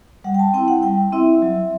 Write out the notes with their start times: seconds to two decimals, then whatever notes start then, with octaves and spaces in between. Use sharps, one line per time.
0.24 G3 F#5
0.34 G5
0.39 A5
0.54 C4 E4 G5
0.68 F#5
0.83 G3 G5
1.12 C4 E4 E5
1.42 F#3